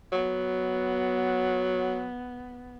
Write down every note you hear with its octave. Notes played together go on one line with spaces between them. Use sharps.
F#3 B3